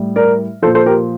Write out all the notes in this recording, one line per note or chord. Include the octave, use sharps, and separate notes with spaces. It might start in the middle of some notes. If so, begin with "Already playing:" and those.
Already playing: A2 G3
A#4 D5
A#2 F3 A4 C5
A4 C5
G4 A#4